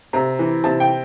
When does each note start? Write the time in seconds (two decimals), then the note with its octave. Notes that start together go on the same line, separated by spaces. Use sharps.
0.13 C3 A#5
0.39 E3
0.64 C3 A5
0.80 G5